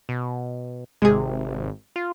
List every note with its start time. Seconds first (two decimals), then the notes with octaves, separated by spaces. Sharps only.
0.09 B2
1.02 G#1 C3 G#3 G#4
1.96 F4